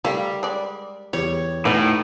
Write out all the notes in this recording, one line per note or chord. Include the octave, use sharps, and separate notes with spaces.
G3 A3 A#4 F5
G#3 D5
E2 G3 G4 C#5
A2 E3 G3 D#4 F#4